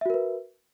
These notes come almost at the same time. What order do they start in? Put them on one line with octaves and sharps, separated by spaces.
E5 F#4 A#4 B4